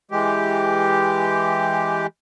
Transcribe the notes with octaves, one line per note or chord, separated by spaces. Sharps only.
E3 G#3 G4